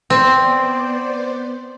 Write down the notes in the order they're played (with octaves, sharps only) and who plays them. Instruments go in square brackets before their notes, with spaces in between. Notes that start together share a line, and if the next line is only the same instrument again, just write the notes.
[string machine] B3 C5 D5 [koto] C4